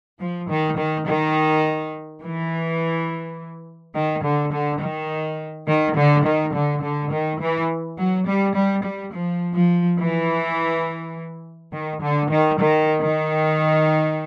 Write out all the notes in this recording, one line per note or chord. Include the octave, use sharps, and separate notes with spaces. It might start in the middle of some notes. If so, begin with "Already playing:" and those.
F3
D#3
D#3
D#3
E3
D#3
D3
D3
D#3
D#3
D3
D#3
D3
D3
D#3
E3
F#3
G3
G3
G3
F3
F3
E3
D#3
D3
D#3
D#3
D#3